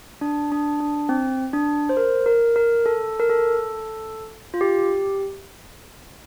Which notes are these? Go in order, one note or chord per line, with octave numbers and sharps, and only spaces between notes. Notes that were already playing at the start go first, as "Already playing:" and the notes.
D4
D4
D4
C4
D4
C5
A#4
A#4
A#4
A4
A#4
A4
F4
G4